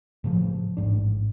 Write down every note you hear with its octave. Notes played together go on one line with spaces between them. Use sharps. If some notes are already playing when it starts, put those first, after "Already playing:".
A2 C#3 F3
A1 G#2 D4